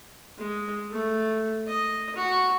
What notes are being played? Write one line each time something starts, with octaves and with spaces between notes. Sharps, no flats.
G#3
A3
D#5
F#4